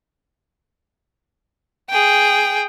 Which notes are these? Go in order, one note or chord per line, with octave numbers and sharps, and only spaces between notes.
G#4 G5